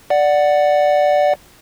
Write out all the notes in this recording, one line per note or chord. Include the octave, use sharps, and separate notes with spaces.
D5 F#5